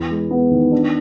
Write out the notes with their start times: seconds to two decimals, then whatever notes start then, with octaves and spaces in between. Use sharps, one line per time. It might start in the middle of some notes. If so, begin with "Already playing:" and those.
Already playing: E2 E4
0.10 G#3
0.31 B3
0.51 D#3
0.72 D4